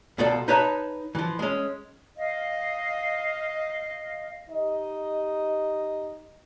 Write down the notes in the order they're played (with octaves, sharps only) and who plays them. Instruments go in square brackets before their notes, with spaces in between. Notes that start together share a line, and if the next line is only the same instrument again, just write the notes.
[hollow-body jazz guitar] C2 B2 F4 A4 D5
D#4 B4 C#5 E5 A5
E3 F3
G#3 C#4
[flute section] D#5 F5
[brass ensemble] D#4 G4 D#5